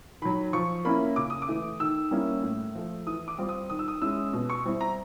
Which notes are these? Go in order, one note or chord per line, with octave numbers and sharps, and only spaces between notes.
D#3 F#3 B5
F3 C#6
A#3 C#4 E4 B5
C#3 D6
D#6
D6
E3 A3
D#3 E6
G3 A#3 C#4 E4
A2
F3 A3
E3 D#6
D6
G3 C4 F4
D#6
D#3 D#6
E6
D#6
G#3 C#4 E4 E6
B2
C#6
G3 C4 E4
A#5